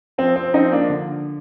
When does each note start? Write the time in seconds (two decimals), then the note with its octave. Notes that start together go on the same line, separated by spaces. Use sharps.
0.18 F3 C4
0.36 C4
0.54 F3 C4 D#4
0.72 A#3 D4
0.90 D3